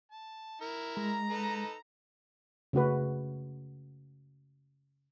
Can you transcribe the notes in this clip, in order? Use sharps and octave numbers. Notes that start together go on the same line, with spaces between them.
A5
E4 A#4
G#3 A#5
D#4 A4 B4
C#3 A3 F#4 B4